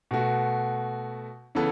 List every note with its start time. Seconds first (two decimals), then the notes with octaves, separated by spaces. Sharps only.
0.11 B2 A3 F#4
1.55 C#3 E3 B3 A4